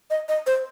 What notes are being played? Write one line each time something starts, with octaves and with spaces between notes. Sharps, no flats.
D#5
D#5
C5